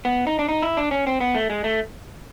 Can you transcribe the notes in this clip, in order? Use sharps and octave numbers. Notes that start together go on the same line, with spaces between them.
B3
D#4
D4
D#4
E4
D4
C#4
C4
B3
A3
G#3
A3